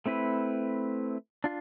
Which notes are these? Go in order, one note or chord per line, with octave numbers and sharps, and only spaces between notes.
A3 C4 E4 B4
D4 F4